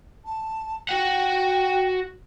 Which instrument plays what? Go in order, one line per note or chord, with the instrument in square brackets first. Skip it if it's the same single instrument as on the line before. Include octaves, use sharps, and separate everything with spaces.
[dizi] A5
[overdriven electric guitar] F#4 F#5 [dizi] G5